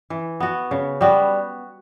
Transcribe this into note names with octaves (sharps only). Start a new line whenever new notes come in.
E3
B3 F#4
C#3
G3 B3 F#4